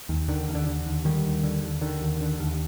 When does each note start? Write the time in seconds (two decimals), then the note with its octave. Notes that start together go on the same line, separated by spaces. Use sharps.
0.09 D#2
0.28 D3 D#3
0.49 D#2
0.55 D3
0.67 D3
0.86 D#2
1.05 D3 D#3 G3
1.24 D#2
1.43 D3
1.62 D#2
1.81 D3 D#3
2.01 D#2
2.21 D3
2.40 D#2